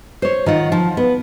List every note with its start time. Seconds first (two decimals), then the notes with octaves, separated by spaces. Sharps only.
0.22 C5 C#5
0.46 D#3 F4 F#5
0.72 F3
0.97 B3